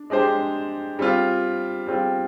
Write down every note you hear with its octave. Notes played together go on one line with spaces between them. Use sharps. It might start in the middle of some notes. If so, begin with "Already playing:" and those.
Already playing: D4
G#3 D4 G4 C5
G3 C4 F4
G3 C4 F4